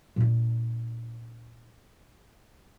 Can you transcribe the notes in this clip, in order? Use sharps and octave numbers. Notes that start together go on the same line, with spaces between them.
A#2 D4